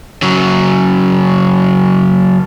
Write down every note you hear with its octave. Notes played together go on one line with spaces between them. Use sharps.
C#3 F#3